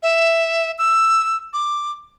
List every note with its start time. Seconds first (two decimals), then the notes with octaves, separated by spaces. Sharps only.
0.03 E5
0.78 E6
1.53 D6